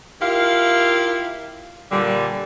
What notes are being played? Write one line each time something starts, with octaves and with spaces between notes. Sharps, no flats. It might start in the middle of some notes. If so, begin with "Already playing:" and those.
E4 F4 G4 A#4 F5
A#2 D3 G3